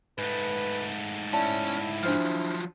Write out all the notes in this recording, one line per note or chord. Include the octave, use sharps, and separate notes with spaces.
G#2 A3 B4
C#4 E4 D5 A5
F3 F#3 D4 C5 F6